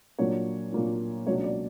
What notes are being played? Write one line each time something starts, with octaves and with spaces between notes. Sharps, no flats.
A#2 F#3 A#3 D4 C#5
A#2 F#3 A#3 D4
C#2 B2 F#3 A#3 D4 C#5
D5